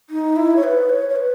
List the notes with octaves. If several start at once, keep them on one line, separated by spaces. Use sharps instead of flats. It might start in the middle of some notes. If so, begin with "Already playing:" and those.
D#4
E4
C#5
B4
C#5
C#5
B4